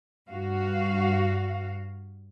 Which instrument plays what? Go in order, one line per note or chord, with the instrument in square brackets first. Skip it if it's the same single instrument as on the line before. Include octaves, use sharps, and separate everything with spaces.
[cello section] G2 F#4 F5